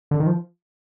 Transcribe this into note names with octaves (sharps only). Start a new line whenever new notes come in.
D3
D#3
F3